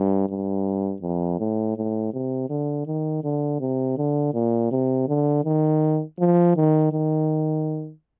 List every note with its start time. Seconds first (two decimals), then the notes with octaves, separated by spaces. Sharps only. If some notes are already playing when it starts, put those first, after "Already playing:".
Already playing: G2
0.29 G2
1.02 F2
1.39 A2
1.77 A2
2.13 C3
2.50 D3
2.87 D#3
3.24 D3
3.60 C3
3.98 D3
4.34 A#2
4.71 C3
5.08 D3
5.45 D#3
6.19 F3
6.56 D#3
6.92 D#3